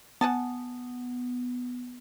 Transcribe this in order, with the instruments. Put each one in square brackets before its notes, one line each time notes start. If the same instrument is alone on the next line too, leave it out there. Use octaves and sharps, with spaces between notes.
[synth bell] B3 [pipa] F#5 G#5 A5